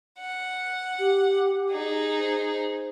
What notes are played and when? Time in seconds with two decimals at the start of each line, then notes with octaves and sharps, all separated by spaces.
0.19 F#5
0.99 G4
1.70 D#4 G#4
2.19 C5